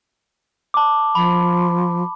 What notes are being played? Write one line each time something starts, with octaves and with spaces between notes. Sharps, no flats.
A5 D6
F3 B5